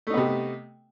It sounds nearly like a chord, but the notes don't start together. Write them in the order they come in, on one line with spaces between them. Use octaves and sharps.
A3 D#4 B3 C3